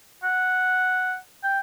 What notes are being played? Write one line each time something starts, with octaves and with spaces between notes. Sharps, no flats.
F#5
G5